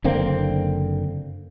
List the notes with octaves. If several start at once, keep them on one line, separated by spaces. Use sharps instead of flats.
F#1 D3 A#3 C4